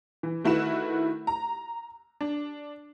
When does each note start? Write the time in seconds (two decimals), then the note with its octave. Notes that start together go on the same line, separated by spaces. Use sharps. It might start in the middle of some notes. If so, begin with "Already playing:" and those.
0.23 E3
0.44 D#3 A3 E4 F#4 B4 E7
1.27 A#5
2.21 D4